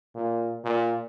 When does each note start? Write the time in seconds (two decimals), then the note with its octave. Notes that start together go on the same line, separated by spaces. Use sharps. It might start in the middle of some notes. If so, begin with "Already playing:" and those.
0.15 A#2
0.65 A#2